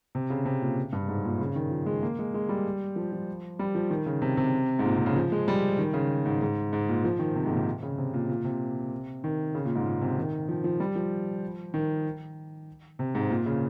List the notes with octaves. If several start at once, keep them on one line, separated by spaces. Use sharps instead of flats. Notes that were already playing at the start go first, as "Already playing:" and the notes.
C3
C#3
C3
A#2
G2
G#2
A#2
C#3
D#3
F3
G#3
A#3
G#3
G#3
G3
F3
F3
G3
F3
D#3
C#3
C3
C3
G#2
A#2
C3
C#3
F3
G#3
G3
D#3
C#3
G#2
G#2
G#2
A#2
F3
D#3
C3
G#2
A#2
C3
C#3
C3
A#2
A#2
C3
D#3
C#3
A#2
G#2
A#2
C3
D#3
F3
F3
G3
F3
D#3
C3
G#2
A#2
C#3